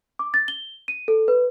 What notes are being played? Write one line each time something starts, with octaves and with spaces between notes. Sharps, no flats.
D6
A6
G7
D#7
A4
B4